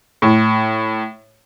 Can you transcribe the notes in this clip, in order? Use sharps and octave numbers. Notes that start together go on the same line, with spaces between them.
A2